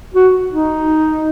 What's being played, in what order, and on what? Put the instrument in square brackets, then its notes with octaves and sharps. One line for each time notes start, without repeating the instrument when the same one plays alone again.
[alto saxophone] F#4
D#4